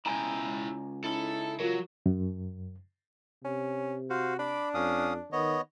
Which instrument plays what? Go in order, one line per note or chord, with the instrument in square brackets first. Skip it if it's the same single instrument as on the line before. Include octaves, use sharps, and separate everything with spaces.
[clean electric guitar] C#2 G#5 A#5 [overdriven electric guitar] E4 G5
[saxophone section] C#4 D#4 E4 [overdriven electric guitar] A4
[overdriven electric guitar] F#3 [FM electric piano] F4 A#4
[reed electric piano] F#2
[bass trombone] C3 [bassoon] C#4
[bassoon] F#4 [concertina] C5 F5
[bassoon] D4 [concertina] B5 D6
[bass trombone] F2 [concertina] C#4 F5 D#6
[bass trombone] D#3 [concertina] B3 C#5 D#5